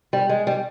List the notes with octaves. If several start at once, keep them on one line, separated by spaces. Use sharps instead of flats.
G3
G#3
G3